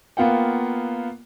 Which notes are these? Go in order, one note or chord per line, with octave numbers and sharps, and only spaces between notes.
A#3 B3 F4 F#5 G5